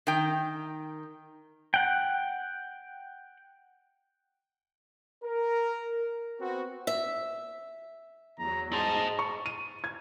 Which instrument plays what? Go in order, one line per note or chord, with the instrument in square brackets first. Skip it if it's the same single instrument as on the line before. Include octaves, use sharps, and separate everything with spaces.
[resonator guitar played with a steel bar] D#3 G5
[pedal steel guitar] F#5 G5
[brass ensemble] A#4
B3 C4 F#4
[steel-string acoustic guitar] E5
[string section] E2 F#3 [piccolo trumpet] A#5
[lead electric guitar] G#4 C5 [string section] D#5 [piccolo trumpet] A5
[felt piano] C#6
D#7
G#6